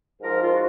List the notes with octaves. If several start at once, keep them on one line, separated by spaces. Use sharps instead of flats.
G#2 F3 A#4
F4
F#4